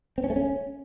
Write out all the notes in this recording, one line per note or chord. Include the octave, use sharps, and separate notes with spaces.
C4
C#4
A3
C#4